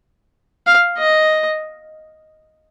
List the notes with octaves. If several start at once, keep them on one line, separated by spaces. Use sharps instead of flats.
F5
D#5